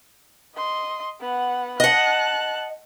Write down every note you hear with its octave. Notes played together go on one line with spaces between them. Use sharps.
D#5 C6
B3 F#5
D#5 F#5 A5 F#6